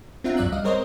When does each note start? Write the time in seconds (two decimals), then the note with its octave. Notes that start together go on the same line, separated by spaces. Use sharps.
0.24 C4 D4 F4 E5 F#5 A#5
0.37 C#2 G2 F#3 D5 E5 F#6
0.52 G3 D#5 F5
0.64 G#3 C4 A#4 C5 C#5 D#5